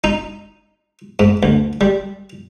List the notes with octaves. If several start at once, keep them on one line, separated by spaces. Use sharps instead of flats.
D#4
G#2
D2
G3